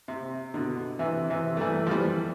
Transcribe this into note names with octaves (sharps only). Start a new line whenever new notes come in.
C3
B2 D3
C3 E3
C3 E3
A3
E3 G3
F3
E3 G3